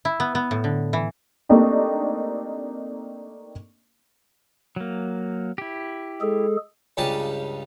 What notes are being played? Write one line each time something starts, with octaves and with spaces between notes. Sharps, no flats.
E4
B3
B3
A2
D3
E3
A3 A#3 C4 D4 D#4 G4
F#3 A#3
E4 G4
G#3 G#4 A4
C#2 G2 C#3 G4 A5 D#6